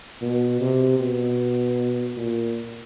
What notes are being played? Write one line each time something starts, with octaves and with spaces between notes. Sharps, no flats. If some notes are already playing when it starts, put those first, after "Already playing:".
B2
C3
B2
A#2